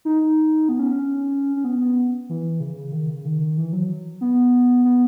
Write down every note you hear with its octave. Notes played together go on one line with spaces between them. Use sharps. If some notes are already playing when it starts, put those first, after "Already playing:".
D#4
B3
C#4
C#4
C#4
B3
B3
E3
C#3
D#3
C#3
D#3
E3
F#3
B3
B3